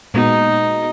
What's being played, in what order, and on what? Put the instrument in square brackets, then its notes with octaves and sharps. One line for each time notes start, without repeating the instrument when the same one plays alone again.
[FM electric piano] A#2 G#3 B3 F#4 [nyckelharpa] D#4